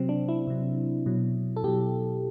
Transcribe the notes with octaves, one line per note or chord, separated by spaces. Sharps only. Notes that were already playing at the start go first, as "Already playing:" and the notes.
Already playing: C3 F#3 C4
D4
E4
C3 F#3
B2 F#3
A4
B2 F#3 G4